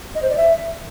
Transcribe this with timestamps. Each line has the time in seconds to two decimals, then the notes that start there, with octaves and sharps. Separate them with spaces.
0.15 D#5
0.22 C5
0.30 D5
0.37 E5